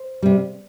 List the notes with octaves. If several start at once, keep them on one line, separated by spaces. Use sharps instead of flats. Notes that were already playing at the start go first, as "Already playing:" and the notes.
Already playing: C5
C3 G3